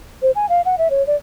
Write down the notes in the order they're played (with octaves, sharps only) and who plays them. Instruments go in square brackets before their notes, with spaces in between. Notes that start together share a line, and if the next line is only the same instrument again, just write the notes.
[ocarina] C5
G#5
F5
F#5
E5
C#5
D5